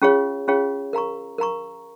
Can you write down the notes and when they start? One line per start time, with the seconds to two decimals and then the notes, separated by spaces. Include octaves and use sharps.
0.02 C#4 F4 G#4 C#5 F5
0.48 C#4 F4 G#4 C#5 F5
0.93 A#4 F5 A#5 C#6
1.38 A#4 F5 A#5 C#6